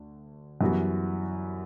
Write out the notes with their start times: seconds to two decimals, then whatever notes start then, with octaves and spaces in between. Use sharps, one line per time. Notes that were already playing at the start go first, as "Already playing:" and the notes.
Already playing: D2
0.61 F#2 E3 G3 B3 F#4